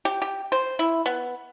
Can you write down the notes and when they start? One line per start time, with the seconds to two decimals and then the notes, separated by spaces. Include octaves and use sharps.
0.05 G4
0.22 G4
0.52 C5
0.79 E4
1.06 B3